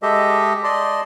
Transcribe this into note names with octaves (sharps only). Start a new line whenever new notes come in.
G#3 G4 A4 D#5 E5
D5 D#5 A5 C6